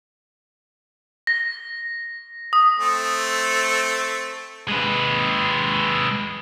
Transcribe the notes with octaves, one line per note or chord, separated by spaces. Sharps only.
A#6
D#6
A3 C4
G#3 B4